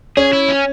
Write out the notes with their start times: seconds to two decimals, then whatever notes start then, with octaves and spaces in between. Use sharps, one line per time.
0.17 C#4 G#4
0.33 E4
0.49 C#4